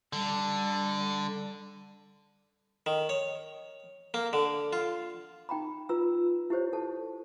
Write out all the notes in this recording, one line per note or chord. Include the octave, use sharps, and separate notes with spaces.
D3 G3
D#3
C#5
A#3
D3
F4
D#4 G5 A#5 B5
F4 B4 A#5 E6
E4 G4 C5 C#5
A4 A5